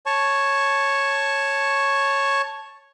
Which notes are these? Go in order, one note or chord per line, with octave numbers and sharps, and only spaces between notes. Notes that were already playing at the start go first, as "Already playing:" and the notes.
C#5 A5 C#6